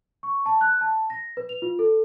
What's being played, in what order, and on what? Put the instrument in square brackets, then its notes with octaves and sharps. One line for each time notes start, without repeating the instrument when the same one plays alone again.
[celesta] C#6
A5
F#6
A5
A#6
B4
F7
F4
A4